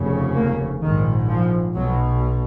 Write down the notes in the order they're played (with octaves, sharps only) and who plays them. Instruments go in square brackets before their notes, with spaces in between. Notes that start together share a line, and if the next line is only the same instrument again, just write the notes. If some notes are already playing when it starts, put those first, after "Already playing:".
Already playing: [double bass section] F1 D#2 C#3
A#3
A#1 G#2 D#3
F3
B1 B2 F#3